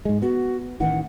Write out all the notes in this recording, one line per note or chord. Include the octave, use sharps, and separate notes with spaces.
G#2 G#3
B3 F#4
A1 D#3 E3 F#5